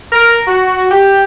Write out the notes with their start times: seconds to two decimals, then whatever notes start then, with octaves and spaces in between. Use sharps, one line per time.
0.12 A#4
0.47 F#4
0.91 G4